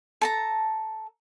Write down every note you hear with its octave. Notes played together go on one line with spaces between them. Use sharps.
A4 A5 A#5